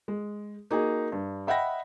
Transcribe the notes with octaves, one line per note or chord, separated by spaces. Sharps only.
G#3
A#3 D#4 F#4 G#4
G2
D#5 E5 F#5 G5 B5 A#6